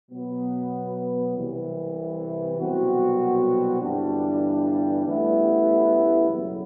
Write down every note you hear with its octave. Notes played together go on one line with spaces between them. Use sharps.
B2 F#3 B3
C2 C3 E3
C2 B2 F#3 C4 F#4
G1 G2 E3 G3 D4
A1 A2 G3 B3 E4
F#1 E2 B2 F#3